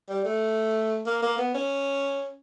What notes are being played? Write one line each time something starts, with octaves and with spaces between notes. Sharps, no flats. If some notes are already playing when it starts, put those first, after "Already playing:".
G3
A3
A#3
A#3
B3
C#4